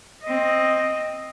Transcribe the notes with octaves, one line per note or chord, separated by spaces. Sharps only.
C4 D#5